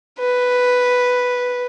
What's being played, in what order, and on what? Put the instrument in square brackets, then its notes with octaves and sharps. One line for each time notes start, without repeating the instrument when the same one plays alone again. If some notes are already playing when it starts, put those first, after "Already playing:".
[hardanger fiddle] B4